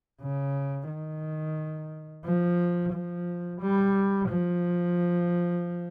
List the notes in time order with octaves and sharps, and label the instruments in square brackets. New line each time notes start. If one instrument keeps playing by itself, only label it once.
[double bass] C#3
D#3
F3
F3
G3
F3